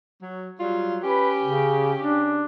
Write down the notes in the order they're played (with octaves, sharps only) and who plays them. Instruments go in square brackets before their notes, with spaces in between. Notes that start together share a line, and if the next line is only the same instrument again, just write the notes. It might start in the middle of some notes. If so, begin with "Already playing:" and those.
[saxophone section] F#3
F#3 G3 F4
[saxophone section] C#4 G4 [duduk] B4
[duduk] C#3
D4